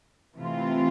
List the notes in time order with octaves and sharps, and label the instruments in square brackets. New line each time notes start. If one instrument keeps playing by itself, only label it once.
[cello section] C3 E3 A3 C4 F4